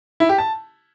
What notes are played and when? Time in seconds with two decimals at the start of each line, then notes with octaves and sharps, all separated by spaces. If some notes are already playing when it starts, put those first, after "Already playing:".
0.20 E4
0.29 G4
0.38 A5